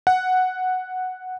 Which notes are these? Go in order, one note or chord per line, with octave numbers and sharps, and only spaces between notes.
F#5